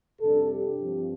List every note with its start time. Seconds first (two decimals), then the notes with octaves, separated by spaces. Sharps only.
0.20 F2 C3 G3 D4 A4
0.49 G4
0.78 G2 F3 C4